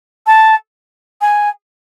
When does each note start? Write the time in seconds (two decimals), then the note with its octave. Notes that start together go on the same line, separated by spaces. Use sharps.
0.27 A5
1.21 G#5